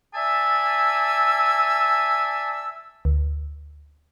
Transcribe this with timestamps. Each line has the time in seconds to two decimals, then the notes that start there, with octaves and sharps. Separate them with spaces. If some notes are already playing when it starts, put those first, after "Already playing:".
0.15 D5 E5 G#5 A5 E6
3.05 D2